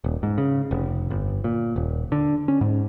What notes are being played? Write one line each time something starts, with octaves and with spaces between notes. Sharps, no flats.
D#1
G#2
C#3
F1
G1
A#2
D#1
D3
C#4
G#2